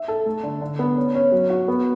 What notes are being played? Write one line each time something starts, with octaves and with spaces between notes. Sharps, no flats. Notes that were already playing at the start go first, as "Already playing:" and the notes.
Already playing: E5
A4
A3
D3
D3
B3
C#4
C#4
F#3
F#4
B3